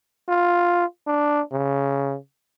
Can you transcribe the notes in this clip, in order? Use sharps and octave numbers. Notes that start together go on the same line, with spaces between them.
F4
D4
C#3